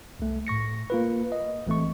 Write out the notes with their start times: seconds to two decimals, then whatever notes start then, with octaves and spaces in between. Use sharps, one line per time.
0.19 C2 A3
0.47 A2 C#6 A#6 C#7
0.90 A#3 F4 B4
1.32 D#5
1.67 A1 E3 A3 C4 C#6